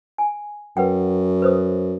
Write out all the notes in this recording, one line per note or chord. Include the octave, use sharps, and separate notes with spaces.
G#5
F#2 B4 F#5 G5
B4 C5 D#6